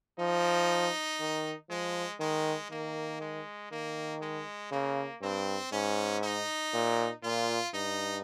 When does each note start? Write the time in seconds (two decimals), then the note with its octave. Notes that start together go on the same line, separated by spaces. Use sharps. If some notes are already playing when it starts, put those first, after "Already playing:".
0.19 F3 D#4
1.19 D#3
1.69 F3 G#3
2.20 D#3 G#3
2.71 D#3 A#3
3.21 G#3
3.71 D#3 A#3
4.22 G#3
4.71 C#3 A#3
5.22 G2 C4
5.72 G#2 C#4
6.23 D#4
6.74 A#2
7.23 A#2 F4
7.74 G2 D#4